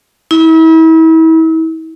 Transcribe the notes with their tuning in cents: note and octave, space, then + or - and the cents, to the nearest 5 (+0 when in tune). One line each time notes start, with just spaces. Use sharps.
E4 -35